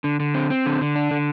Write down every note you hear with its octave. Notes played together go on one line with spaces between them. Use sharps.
D3
D3
C4
C4
D3
D3
D4
D3